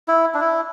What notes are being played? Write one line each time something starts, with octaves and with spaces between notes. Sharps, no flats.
E4
D4
E4